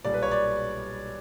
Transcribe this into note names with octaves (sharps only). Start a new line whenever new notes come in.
B1 A#2 G3 D5
B4
C#5
D5